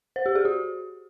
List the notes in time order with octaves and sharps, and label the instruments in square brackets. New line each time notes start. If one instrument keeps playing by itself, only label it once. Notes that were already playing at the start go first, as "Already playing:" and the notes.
[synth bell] C5
G4
G#4
F#4